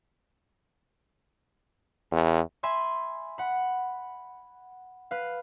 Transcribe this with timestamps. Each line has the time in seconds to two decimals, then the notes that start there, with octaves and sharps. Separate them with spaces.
2.12 E2
2.63 E5 G#5 B5 C6
3.38 F#5 B5
5.11 B4 F5